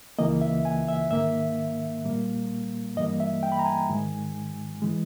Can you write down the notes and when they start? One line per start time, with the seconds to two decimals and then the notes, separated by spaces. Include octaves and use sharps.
0.19 C#2 C#3 E3 A#3 D#5
0.41 E5
0.65 G#5
0.88 E5
1.11 G#2 D#3 A#3 E5
2.04 A#2 G3 A#3
2.96 G2 E3 G3 A#3 D#5
3.20 E5
3.43 G5
3.52 B5
3.59 A#5
3.66 G#5
3.90 G#2 D#3 G#3
4.82 E3 G#3